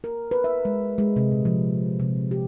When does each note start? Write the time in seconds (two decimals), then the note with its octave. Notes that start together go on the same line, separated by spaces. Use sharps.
0.04 A#4
0.31 B4
0.44 E5
0.65 G#3
0.98 G#3
1.16 C3
1.31 A#2
1.45 F3
2.00 C3
2.31 G4